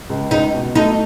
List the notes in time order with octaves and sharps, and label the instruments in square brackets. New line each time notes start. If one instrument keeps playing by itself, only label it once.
[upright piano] C#2
[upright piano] C#2 [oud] D#4
[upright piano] B2
[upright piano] A3 [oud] D#4